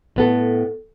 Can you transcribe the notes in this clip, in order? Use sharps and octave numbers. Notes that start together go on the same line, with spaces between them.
A2 B3 A4